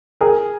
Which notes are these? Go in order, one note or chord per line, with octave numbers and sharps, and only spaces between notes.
G#4 A#4